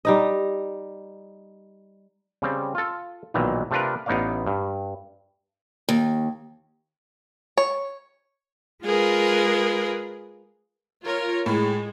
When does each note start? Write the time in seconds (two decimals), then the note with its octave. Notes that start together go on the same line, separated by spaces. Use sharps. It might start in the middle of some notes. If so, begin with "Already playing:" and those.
0.05 G3 D#4 D#5
2.42 C#3 G3 C4
2.75 F4 A4
3.34 B1 A#2 D#3 E3
3.71 C3 A3 D4 F4 A#4 B4
4.06 A1 B3 D#4 C#5 D5 F5
4.46 G2
5.89 D#2
7.58 C#5
8.84 G#3 F4 G#4 A#4 B4
11.04 F4 A#4 C#5
11.46 A2 G#3